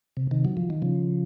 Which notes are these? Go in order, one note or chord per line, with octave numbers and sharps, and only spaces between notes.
C3
C3 D#3
F#3
F3
D#3
C#3 F3